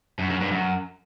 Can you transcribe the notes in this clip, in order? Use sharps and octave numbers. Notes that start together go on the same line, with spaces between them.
F#2
F#2
G2
F#2